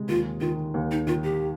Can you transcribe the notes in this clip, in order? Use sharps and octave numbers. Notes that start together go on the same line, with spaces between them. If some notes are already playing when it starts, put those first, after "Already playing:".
Already playing: C3 G#3
D#2 F4
D#3 F4
D#2
D#4
D#3 F4
G4